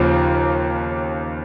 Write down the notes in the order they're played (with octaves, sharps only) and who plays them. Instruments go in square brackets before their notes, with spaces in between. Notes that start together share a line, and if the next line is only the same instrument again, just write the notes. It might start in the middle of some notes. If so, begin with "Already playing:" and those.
Already playing: [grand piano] D#2 C#3 F3 A#3